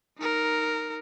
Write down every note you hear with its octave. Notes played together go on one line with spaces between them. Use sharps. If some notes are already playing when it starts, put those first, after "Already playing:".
D#4 A#4